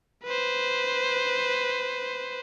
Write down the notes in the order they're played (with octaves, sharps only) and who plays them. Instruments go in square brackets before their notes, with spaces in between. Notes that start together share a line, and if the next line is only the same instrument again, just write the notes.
[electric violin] B4 C5